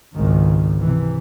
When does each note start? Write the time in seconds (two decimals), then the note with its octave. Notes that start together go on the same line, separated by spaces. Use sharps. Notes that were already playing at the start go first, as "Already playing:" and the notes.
0.16 G#1 C#2 D#3
0.82 C3 E3